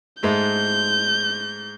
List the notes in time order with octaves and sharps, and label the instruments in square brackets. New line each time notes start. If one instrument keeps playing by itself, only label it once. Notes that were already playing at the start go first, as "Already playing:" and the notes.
[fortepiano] G#2 G#3 A3 [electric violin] G6